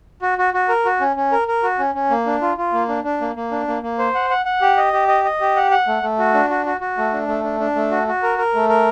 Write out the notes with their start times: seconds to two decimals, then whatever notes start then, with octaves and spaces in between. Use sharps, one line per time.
0.22 F#4
0.38 F#4
0.54 F#4
0.69 A#4
0.85 F#4
1.01 C#4
1.16 C#4
1.32 A#4
1.48 A#4
1.63 F#4
1.79 C#4
1.95 C#4
2.10 A#3
2.26 D4
2.42 F4
2.57 F4
2.73 A#3
2.88 D4
3.04 D4
3.21 A#3
3.36 A#3
3.51 D4
3.68 A#3
3.83 A#3
3.99 C5
4.15 F#5
4.30 F#5
4.46 F#5
4.61 G4
4.77 D#5
4.93 G4
5.08 D#5
5.24 D#5
5.40 G4
5.56 F#5
5.71 F#5
5.87 A3
6.03 A3
6.19 F#4
6.34 D4
6.50 F#4
6.66 F#4
6.81 F#4
6.97 A3
7.13 D4
7.28 A3
7.44 D4
7.60 D4
7.76 A3
7.91 F#4
8.07 F#4
8.23 A#4
8.38 A#4
8.55 A3
8.69 A#4